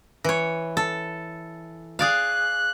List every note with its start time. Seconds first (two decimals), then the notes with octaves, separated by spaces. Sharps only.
0.24 E3 C#5
0.77 A4
1.99 G#4 D5 F5 F#6